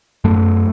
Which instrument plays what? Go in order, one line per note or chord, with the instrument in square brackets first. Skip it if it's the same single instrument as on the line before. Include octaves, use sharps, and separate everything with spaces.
[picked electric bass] F#2 A3